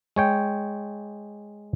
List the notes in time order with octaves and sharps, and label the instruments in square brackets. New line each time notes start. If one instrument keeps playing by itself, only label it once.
[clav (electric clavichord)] G#3 C#5 G5